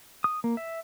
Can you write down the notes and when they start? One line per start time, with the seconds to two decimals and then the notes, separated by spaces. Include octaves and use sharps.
0.24 D#6
0.44 A#3
0.57 E5